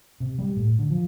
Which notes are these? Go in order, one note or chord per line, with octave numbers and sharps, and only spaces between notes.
C3
G3
A2
D3
F3